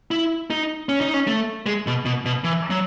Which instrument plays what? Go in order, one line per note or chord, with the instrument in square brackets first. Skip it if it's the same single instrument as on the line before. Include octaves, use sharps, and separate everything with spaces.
[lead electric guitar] E4
D#4
C#4
D#4
C#4
A3
G#3
B2
B2
B2
E3
F#3